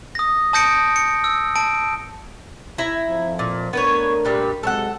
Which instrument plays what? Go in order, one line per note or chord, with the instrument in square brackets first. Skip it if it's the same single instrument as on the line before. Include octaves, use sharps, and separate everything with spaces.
[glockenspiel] D#6 A#6
A5 D#6 G6 A#6 C#7 D7
C#7
E6
A5 D7
[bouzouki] E4 A#5
[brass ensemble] F2 F3
[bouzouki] A#2
[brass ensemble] A3 D4 A#4 [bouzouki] B3 B4 C#5
[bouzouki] A#2 G3 B4
[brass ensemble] C3 F#3 G#3 [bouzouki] A4 C#5 F#5